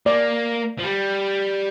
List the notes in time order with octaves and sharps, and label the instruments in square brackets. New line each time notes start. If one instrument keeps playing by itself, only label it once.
[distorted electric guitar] A#3 [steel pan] D5
[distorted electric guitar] F3
G3